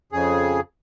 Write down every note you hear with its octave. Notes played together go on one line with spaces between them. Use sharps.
F2 C#3 G#4